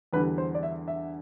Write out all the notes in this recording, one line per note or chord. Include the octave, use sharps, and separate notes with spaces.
E2 D3 G3 B4
C5
D5
E5
E5